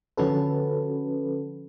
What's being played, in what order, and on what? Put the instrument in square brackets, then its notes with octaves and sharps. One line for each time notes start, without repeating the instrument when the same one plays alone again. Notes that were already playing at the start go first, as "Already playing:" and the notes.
[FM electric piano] D3 F3 C#4 F#4 A4 B4